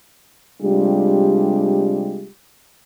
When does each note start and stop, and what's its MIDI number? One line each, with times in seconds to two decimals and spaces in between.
0.62 2.28 48
0.62 2.28 55
0.62 2.28 56
0.62 2.28 62
0.62 2.28 65
0.62 2.28 67